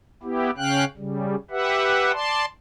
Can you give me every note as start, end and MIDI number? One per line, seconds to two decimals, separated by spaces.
0.23 0.51 59
0.23 0.51 64
0.23 0.51 67
0.57 0.85 49
0.57 0.85 61
0.57 0.85 77
0.57 0.85 79
0.57 0.85 90
0.97 1.35 49
0.97 1.35 55
1.51 2.12 67
1.51 2.12 71
1.51 2.12 76
1.51 2.12 78
2.13 2.45 74
2.13 2.45 81
2.13 2.45 84